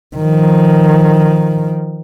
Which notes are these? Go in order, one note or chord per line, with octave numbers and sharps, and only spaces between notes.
D#3 F3